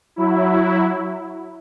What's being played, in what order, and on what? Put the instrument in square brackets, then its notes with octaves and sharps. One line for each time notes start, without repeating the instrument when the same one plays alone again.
[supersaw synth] F#3 E4